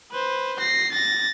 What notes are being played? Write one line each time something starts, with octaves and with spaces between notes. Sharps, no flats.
B4 C5
A#6 C7
A6 A#6